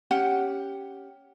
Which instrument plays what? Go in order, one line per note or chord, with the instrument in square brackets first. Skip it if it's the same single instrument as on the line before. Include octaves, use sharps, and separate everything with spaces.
[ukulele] C#4 G4 F#5